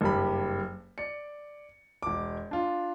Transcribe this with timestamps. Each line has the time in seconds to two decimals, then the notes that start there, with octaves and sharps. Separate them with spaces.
0.01 F#1 G2 G4 B5
0.98 D5 C#7
2.03 E1 D6
2.51 D4 F4